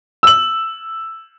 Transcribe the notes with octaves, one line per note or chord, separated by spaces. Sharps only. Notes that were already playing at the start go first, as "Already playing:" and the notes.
E6 F#7